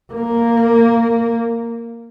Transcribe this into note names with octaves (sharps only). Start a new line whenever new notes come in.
A#3